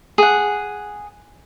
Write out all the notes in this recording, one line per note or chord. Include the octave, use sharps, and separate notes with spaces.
G#4 F#5